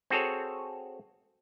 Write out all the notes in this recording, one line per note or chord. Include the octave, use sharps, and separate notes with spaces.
C4 F#4 G#4 A4 C#5